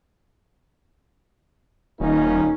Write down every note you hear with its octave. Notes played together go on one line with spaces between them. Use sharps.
D#1 A#3 C#4 D#4